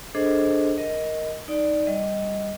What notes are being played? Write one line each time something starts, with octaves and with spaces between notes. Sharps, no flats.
D4 G#4 A4 C5 D#5
A#4 D#5
D#4 D5
G3 D#5